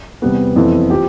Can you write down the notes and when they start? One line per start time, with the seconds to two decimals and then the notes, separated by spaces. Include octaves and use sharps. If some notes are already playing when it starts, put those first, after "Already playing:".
0.22 E2 C3 G3 B3
0.56 F2 E3 B3 E4 A4
0.90 F3 C4 G4